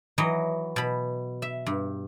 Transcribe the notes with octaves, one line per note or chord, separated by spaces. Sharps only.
E3 F#3 D#5
B2 B5
E5
G2